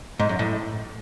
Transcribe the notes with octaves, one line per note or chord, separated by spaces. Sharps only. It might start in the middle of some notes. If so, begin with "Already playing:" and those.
G#2
F#2
A2